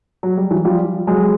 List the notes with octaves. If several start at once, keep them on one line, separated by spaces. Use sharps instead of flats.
F#3
G3
E3 F#3
F3 G3
F#3 G#3